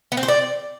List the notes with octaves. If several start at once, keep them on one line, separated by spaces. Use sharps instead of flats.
B3
C4
C5
D5